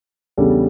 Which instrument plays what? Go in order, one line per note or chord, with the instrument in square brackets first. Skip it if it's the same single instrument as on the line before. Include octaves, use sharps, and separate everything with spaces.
[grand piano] E2 C#3 G3 D4 A4